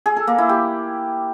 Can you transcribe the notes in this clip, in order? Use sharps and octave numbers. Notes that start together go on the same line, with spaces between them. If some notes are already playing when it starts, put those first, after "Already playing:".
G#4
A4
A#3
E4
G4